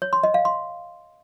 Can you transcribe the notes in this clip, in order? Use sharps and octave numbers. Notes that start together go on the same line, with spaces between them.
C#5
C6
D#5
F5
C6